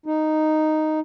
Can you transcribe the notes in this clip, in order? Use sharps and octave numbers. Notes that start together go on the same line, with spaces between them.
D#4